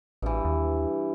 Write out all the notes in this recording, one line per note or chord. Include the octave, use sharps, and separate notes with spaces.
A1 G2 E3
D#2